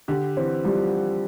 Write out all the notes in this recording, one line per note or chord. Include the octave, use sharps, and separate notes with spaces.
D3 G4
E3 C4
F3 G3